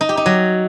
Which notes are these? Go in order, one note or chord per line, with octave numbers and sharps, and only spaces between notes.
D#4
G4
D#4
F#3